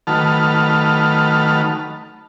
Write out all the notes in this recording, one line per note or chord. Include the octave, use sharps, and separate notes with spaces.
D#3 F#3 A3 B4 A5 F6